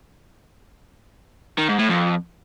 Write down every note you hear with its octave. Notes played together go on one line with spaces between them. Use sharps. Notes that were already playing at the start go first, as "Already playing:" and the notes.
D#3
G#2
A2
F2